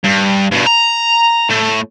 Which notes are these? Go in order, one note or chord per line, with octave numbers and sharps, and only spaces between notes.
G2
G2 B2
A#5
A2 A3